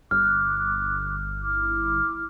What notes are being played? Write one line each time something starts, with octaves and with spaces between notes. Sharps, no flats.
G1 D6 F6 F#6
E4 D6 F6